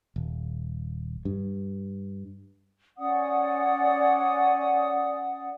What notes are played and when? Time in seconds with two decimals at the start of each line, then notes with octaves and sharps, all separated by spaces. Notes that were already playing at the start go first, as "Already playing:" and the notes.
0.16 D#1
1.25 G2
2.98 C#4 D5 F#5 D#6